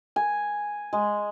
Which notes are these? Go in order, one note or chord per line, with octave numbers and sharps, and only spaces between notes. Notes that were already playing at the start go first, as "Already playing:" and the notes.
G#5
G#3